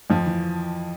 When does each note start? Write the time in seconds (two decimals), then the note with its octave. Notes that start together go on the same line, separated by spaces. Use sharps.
0.10 F2 F3
0.26 E3